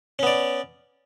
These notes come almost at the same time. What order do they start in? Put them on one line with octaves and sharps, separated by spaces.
C#4 B3 D5